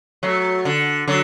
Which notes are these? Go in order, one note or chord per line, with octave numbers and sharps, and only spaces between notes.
F#3 A3
D3
D3 F#3